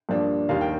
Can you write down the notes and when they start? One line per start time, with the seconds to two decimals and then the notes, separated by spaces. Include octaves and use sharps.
0.09 G2 F3 A#3 D4
0.49 D#2 D#3 G3 F5
0.61 G5